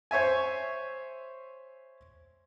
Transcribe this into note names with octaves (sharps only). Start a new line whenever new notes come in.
C5 C#5 E5 G#5